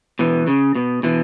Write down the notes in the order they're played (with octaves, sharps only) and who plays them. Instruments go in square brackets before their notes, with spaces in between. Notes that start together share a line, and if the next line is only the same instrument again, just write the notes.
[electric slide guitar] B2 E3
C#3
B2
B2 E3